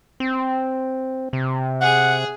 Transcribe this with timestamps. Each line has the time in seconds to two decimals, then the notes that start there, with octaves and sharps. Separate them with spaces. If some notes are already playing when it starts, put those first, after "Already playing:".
0.20 C4
1.33 C3
1.81 G#4 F#5